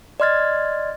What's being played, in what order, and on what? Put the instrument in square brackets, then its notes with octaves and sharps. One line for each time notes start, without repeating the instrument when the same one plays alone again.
[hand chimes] D5 D#5 C6 F6 G#6 A6